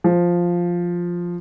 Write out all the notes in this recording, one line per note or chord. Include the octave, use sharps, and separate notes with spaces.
F3